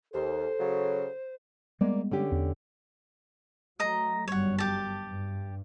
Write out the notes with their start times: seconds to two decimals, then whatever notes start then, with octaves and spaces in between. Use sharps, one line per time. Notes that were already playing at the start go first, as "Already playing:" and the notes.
0.13 D#2 A4 C5
0.59 C#3 F#3
1.81 G3 G#3 A#3 B3 D5
2.11 D3 C#4 G4
2.31 E2
3.80 F#3 A3 D#5 A#5
4.28 G1 F#2 G3 C#5 F#5
4.58 G4 A5
5.09 G2